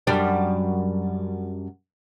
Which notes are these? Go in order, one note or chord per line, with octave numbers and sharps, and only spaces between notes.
F#2 G3 D4